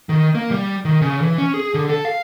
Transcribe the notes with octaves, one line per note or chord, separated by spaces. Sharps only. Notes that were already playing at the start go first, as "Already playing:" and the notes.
D#3
A#3
G3
D#3
C#3
E3
C#4
G#4
D3
A4
F5